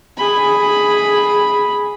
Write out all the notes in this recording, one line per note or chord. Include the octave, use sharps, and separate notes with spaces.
G#4 B5